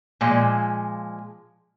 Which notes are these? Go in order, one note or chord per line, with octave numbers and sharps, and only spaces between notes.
A#2 F3 G#3